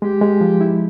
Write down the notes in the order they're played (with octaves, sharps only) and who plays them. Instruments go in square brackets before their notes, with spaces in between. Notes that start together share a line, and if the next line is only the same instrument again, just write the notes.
[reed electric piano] G#3 [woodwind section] G4
[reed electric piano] G#3
F3
E4